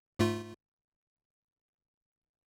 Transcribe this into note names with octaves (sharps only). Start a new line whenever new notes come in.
G#2 A3 F4